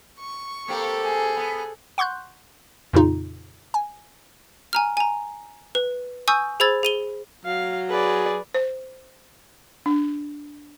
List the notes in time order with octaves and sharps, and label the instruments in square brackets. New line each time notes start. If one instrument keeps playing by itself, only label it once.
[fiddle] C#6
[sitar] A#3 C4 G4 [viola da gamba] A4
[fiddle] G#4
[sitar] B3
[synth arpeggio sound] F#5 C6 C#6 F#6 G6
F2 A#2 C#3 D#4 F4
G#5
[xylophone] G#5 A#5 F6
G#5 A#5
B4
G#5 C#6 D#6 E6 G6
G#4 C5 B5 E6 G#6 A6
G#4 D#7 G7
[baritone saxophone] F#3 [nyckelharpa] F5
[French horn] G#4 [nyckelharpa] B4 D5
[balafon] C5
D4